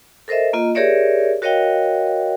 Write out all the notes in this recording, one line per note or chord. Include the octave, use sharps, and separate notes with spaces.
A4 A#4 C5 D#5 E5
A#3 F4 D#5
G4 G#4 A#4 C#5 D5 E5
F#4 A#4 C#5 D#5 F5 G5